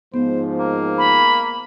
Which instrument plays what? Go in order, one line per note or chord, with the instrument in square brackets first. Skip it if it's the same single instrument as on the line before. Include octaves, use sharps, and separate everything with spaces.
[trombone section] G#2 F3 [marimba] B3 [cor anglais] C5
[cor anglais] A#3
[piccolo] B5